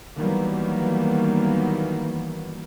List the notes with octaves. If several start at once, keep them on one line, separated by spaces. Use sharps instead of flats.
D#3 E3 F#3 G3 A#3 B3